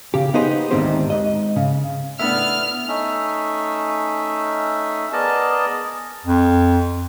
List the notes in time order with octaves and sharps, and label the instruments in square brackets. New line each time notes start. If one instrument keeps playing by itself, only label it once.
[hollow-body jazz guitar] C#3 G4
B3 D#4 G4 G#4 C5
D2 G#2 D#3 C4 G4 C5
G#2 D#5
C#3
[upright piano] A2 D4 [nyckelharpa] B3 [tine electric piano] E5 [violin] F6
[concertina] A3 C#4 D#4 E5
B3 G#4 A#4 D5 D#5 A5
[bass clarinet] F2